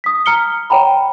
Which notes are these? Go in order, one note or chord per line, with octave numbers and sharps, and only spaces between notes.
D#6 B6
A#5 F6 C#7 G7
C#5 F#5 G5 A#5 B5